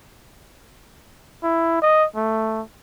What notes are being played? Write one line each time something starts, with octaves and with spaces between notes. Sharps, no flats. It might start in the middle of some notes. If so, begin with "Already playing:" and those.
E4
D#5
A3